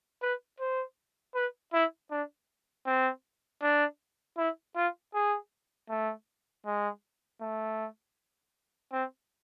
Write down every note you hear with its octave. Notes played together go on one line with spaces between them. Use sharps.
B4
C5
B4
E4
D4
C4
D4
E4
F4
G#4
A3
G#3
A3
C4